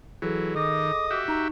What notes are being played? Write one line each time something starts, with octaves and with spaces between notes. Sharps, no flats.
E3 F#3 G#4 A4
D#3 D#5 D6
F#4 G4 E5
D#4 A#5 C#6